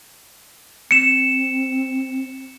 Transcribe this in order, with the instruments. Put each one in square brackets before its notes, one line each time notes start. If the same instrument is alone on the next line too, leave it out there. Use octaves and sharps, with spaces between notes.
[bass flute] C4 [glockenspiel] C#7 E7